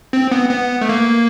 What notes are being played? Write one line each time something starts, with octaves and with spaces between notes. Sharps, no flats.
C4
B3
B3
A3
A#3